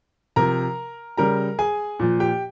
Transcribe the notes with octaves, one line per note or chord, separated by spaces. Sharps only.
C3 F3 A#4 A#5
C#3 G3 A#4 A#5
G#4 G#5
A#2 F3
G4 G5